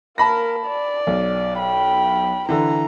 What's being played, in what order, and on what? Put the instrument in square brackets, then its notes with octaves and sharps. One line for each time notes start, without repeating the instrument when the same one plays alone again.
[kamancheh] A#3 A#4 [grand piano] A5 B5 A#6
[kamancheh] D5
[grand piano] B1
[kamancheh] G5 B5
[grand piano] D3 E3 [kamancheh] A#5